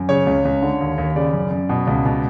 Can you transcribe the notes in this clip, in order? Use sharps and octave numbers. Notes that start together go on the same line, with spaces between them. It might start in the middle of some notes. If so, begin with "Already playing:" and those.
Already playing: F#2
C#3 C#5
C#2
C#2
D3
D#2
D#2
C#3 D5
F#2
F#2
B2
C#2
B2